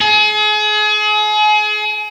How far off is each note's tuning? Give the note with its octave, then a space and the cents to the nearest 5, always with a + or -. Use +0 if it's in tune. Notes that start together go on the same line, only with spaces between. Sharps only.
G#4 +35